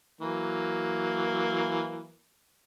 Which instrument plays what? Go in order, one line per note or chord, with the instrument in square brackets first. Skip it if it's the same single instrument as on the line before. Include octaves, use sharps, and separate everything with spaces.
[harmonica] E3 F#3 A#3